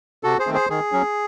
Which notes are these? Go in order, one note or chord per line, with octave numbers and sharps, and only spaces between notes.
C3 F#4 A4
G#4 C5
D#3 A3 C4
G#4 C5
D#3 G#4
F#3 C#4